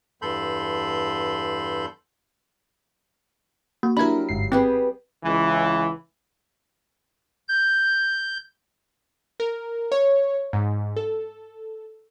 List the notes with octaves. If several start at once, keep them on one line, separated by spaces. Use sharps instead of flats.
E2 G2 A4 B5 C6 G6
A#3 F#4
F#3 G3 D4 E4 A#4 B5 G#6
G1 G#2 C7
G3 B3 C4 G#4 G5
C#2 E3
G6
A#4
C#5
G#2
A4